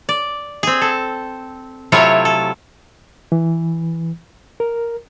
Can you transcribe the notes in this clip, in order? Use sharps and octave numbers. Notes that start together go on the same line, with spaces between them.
D5
C4 G#4
A4
C3 F#3 A3 E4 F4 C#5
A4
E3
A#4